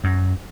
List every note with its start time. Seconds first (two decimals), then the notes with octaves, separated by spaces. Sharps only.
0.04 F#2